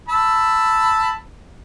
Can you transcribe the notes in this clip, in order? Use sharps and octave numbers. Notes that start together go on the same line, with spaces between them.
A5 B5 E6